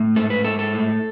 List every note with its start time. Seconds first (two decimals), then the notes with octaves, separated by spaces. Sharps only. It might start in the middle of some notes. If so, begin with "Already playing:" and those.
Already playing: A2
0.16 G#2 A4
0.30 B4
0.45 G#2 A4
0.59 A4
0.73 A2